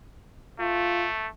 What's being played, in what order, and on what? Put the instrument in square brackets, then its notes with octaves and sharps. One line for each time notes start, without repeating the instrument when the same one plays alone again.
[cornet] A3 [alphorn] F4